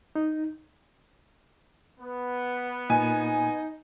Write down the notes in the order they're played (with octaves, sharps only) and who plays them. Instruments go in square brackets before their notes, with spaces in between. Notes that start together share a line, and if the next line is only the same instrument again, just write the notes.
[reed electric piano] D#4
[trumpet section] B3
[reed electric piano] A#2 [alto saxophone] D#4 [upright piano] G#5